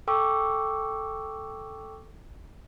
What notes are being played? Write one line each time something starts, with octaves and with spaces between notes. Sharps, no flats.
A4 G5 C#6 D6 E6